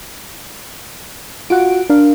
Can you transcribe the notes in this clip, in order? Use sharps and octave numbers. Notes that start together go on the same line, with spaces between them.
F4 F#4 F#5 D7
D4 A#4 F5